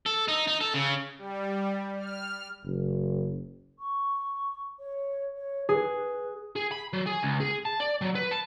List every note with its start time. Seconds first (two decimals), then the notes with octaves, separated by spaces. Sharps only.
0.06 A4
0.28 D#4
0.47 D#4
0.61 A4
0.74 C#3
1.18 G3
1.98 F6
2.65 F#1
3.79 C#6
4.79 C#5
5.36 C#5
5.69 G#4 B4
6.56 G#4
6.71 B5
6.93 F#3
7.06 G#4
7.23 C#2
7.40 G#4
7.65 A5
7.80 D5
8.01 F#3
8.15 B4
8.31 A5